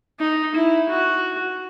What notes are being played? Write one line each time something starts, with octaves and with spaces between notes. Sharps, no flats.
D#4
E4
F#4